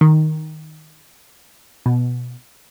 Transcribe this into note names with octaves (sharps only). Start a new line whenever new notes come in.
D#3
B2